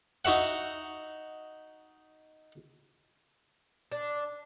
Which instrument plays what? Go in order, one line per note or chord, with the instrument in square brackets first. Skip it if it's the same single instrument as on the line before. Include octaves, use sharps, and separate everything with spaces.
[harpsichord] D#4 F#4 E5 F#5
[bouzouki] D4